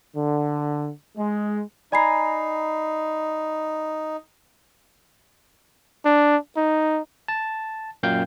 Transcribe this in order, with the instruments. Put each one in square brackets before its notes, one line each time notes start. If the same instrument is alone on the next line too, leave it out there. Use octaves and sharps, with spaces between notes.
[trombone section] D3
G#3
[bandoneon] D#4 [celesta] D5 B5 C7 [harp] G#5 A#5
[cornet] D4
D#4
[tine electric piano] A5
F#2 A#2 F5 G5 G6